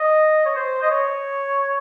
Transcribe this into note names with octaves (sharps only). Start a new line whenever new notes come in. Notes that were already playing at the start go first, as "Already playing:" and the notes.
Already playing: D#5
C#5
C5
D#5
C#5